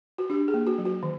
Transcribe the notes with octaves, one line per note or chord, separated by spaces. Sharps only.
F#4
D4 G4
G#4
A#3
F#4
F#3
F#4
D#3